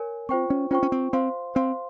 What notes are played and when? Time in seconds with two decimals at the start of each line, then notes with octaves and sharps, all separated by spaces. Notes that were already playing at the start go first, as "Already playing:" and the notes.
Already playing: A#4 C#5 G#5
0.29 C4 F4 C5 G5 C#6
0.50 C#4
0.71 C#4 F4 C5 G5 C#6
0.83 C#4
0.92 C4
1.13 C4 C5 F5 C6
1.55 C4 C5 F5 C6